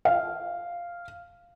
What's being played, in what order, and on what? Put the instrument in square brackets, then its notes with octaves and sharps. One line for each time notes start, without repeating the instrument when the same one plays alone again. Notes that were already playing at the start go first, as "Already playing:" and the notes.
[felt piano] F5